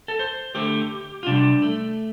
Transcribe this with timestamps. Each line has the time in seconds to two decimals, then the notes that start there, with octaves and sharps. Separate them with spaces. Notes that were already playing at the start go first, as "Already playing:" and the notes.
0.08 A4
0.19 C5
0.55 D3 A3 G4
1.23 F4
1.26 C3 G3 D4
1.62 A3